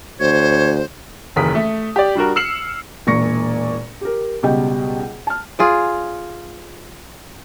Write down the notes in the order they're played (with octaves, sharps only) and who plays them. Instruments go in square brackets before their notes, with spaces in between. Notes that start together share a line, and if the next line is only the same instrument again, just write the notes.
[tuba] D2 [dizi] C5 [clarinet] C#5
[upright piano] F#1 D#2 E3 A#4 D#6 B6
A3
G4 D5
G3 D4 F#4 A#4
E6 F6 C7 C#7 E7 F#7
[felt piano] E1 A#2 C#6 A#6 C#7
G4 A#4
C#2 B2 G3 D#5 G5
A5 F6
[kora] F4 G#4 D5